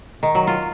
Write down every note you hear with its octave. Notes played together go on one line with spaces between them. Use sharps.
D#3
F#3
F4